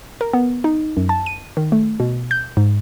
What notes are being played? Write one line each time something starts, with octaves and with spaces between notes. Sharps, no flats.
A#4
B3
D#4
F#2
A5
D#7
D#3
A3
B2
G6
G#2